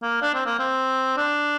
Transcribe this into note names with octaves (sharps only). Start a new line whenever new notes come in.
A#3
D4
C4
A#3
C4
D4